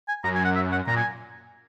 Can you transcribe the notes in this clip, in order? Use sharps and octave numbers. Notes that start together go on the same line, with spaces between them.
G#5
F#2 A#5
G#5
F#5
E5
F#5
A#2 A#5
G#5